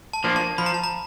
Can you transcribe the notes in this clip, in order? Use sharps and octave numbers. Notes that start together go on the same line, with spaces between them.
A5
F3 A#3 D4
A5
F3 B5
A#5
A5
A#5